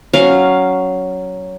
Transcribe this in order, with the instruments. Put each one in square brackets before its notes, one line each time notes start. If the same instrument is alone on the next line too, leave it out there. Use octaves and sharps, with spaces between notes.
[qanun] F#3 C#4 F5